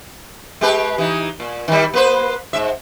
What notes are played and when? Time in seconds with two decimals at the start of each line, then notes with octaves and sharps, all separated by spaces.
0.61 G#3 G4 B4
0.98 E3 D#4
1.40 A#2
1.68 D#3 G3
1.94 A#3 B4 C5
2.53 G#2 E5